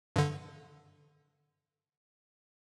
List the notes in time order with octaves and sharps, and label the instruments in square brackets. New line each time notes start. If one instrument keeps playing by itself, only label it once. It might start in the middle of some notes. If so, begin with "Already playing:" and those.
[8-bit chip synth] G2 D3